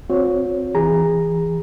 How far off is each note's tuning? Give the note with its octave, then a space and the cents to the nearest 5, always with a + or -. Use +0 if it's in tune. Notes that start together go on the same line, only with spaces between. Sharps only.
C4 +0 F#4 -45 C#5 +10
E3 +0 G#4 -25 A#5 +0